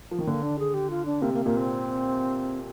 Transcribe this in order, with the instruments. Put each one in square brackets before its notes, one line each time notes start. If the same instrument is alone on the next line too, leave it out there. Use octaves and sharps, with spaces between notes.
[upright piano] F3
D#3
[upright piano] D3 [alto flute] A#3
[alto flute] D4
G#4
G4
F4
D4
[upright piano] C3 [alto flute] A#3
[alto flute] A#3
[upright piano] A#2 [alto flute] A#3
[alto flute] C4